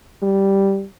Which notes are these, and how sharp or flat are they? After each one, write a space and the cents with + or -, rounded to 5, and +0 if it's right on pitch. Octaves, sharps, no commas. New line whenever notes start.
G3 -5